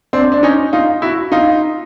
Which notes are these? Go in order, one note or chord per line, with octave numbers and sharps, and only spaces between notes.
C4 D4
D4
C#4 D#4
D#4 F4
E4 F#4
D#4 F4